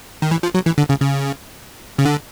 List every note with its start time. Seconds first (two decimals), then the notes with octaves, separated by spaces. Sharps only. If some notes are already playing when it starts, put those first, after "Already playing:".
0.22 D#3
0.31 E3
0.43 F3
0.54 F#3
0.66 E3
0.78 D3
0.89 C#3
1.00 C#3
1.99 C#3
2.05 D3